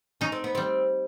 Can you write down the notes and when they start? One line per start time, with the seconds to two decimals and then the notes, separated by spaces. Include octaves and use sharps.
0.21 C#4 D#4
0.32 C4
0.44 B3
0.55 G3 C4